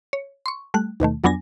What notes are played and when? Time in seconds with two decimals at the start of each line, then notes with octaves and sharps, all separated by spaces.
0.13 C#5
0.46 C6 C#6
0.74 G3 A3 F#6
1.00 D#2 B2 D#3 A3
1.24 F2 F#3 B3 D4 G#5 A#6